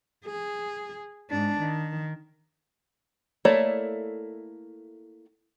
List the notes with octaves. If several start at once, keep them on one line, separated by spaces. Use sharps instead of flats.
G#4
G#2 D4
D#3
A3 A#3 E4 C#5 D5